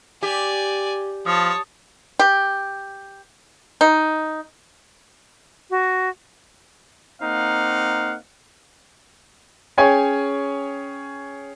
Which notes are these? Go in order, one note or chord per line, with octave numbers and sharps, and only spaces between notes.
G4 D5 G#5
F3 C#5 A5 D#6
G4
D#4
F#4
A#3 C4 D#4 F5 F#5
C#4 G#4 C#5 G5 G#5